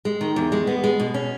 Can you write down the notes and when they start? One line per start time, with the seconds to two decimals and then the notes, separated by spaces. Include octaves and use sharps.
0.05 G#3
0.21 D#3
0.36 E2
0.52 G#3
0.67 B3
0.84 G#3
1.00 B2
1.14 C#4